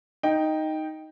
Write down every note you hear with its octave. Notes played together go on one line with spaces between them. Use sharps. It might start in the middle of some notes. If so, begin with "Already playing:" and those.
D#4 G5